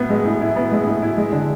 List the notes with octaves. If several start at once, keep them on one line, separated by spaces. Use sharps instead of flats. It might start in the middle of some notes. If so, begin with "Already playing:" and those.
Already playing: A2 B3 E4
G#3
A2
E4
B3
G#3
A2
E4
G#3
D3